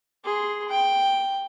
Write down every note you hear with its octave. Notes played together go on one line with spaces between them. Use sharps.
G#4 C6
G5